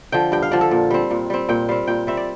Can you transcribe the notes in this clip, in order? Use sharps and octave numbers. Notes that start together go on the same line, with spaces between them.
D3 F3 G5
G2 G5
F5
D3 F3 D5
A4
A#2
G3 C4
A#2
G3 C4
A#2 G5
G3 C4 F5
A#2 G5
G3 C4 E5
D5